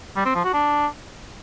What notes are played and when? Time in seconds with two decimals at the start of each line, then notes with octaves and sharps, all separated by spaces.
0.16 G3
0.26 C4
0.35 F3
0.44 F#4
0.54 D4